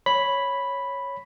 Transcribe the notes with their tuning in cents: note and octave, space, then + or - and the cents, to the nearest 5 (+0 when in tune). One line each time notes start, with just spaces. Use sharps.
C#5 -5 B5 +0